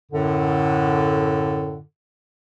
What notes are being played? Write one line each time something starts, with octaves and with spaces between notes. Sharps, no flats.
F#2 A2 D3